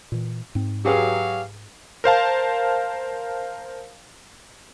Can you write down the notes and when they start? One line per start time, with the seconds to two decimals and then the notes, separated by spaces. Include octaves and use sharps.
0.12 A#2 E3
0.55 G#2 C4
0.85 F#3 G4 G#4 B4 F5
2.04 A#4 C5 F5 A5